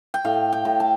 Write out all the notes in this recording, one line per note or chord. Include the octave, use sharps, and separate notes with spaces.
G5
A2 F5
G5
A2
A5